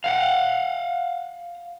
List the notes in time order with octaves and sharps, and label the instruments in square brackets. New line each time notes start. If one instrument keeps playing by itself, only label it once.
[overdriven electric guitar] F5 F#5